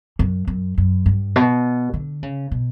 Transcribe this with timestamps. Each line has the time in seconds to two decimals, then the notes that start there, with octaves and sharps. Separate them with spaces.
0.19 F#2
0.47 F#2
0.78 F#2
1.06 G2
1.36 B2
1.94 D3
2.23 C#3
2.51 B2